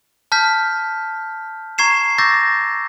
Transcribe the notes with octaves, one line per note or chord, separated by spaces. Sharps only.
A5 F6 G6 B6
A#5 C#6 G#6 C7 E7
C#6 D6 E6 G6 A6 A#6